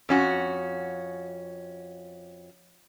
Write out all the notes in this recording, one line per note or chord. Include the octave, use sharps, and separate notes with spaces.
F2 C#4 F#4